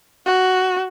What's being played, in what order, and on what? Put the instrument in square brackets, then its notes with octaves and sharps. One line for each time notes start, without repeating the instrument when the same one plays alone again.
[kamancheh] F#4